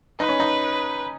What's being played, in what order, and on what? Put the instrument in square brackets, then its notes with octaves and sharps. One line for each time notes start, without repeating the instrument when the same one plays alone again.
[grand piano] D#4 [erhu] B4
[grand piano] C#4
D#4